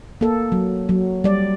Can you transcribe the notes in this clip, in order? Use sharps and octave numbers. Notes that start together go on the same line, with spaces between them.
A#3 A4
F#3
F#3
G3 D5